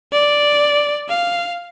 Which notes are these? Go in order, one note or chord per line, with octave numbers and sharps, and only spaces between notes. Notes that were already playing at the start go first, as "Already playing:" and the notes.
D5
F5